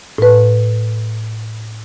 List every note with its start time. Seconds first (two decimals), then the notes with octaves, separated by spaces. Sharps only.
0.18 A2 B4